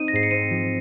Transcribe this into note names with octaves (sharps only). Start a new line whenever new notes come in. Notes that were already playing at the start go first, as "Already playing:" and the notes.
Already playing: C4 D#4 D#7
A#6
G#2 C7
C#7
C4 D#7
F3